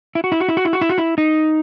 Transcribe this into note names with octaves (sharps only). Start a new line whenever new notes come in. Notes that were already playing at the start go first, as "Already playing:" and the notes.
E4
F#4
E4
F#4
E4
F#4
E4
F#4
E4
F#4
E4
D#4